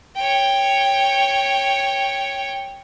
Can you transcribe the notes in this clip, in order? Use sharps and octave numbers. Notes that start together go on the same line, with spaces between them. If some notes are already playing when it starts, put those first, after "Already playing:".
C#5 G5